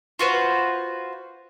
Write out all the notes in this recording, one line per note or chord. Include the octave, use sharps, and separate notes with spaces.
F4 F#4 B4 C5